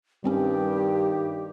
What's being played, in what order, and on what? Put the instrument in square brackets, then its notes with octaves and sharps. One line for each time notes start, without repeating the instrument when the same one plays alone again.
[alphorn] G2 [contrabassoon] D#3 [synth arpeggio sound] G3 C4 C#4 [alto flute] G4